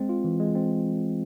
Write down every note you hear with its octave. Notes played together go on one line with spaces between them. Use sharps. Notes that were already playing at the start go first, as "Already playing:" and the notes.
Already playing: G#3 C4
F4
E3
G#3
C4